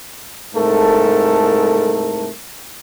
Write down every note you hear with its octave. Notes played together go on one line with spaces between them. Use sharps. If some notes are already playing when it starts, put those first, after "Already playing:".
C2 G#2 A3 A4 A#4